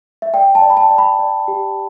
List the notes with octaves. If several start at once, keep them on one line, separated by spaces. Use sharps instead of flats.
E5
D5 G5
A5
D5
B5
A5
D5
B5
D5
G4